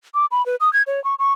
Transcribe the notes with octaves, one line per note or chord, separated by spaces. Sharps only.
D6
B5
B4
D#6
G#6
C#5
C#6
C#6